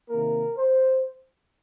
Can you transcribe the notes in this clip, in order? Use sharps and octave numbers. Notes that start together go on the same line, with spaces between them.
C3 D#3 A#3 A#4
C5